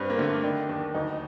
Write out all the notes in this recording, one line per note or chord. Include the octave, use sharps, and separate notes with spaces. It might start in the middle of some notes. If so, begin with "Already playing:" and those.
Already playing: G2 C4
A#3
D3 A3
A#3
D#3 D4
D#2
D2 D#4